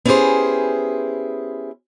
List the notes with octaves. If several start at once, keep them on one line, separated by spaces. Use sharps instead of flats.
B3 C#4 E4 G4 G#4 C5